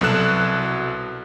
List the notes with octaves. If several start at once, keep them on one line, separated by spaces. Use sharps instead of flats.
C2 B2 F#3 A4 F#6 E7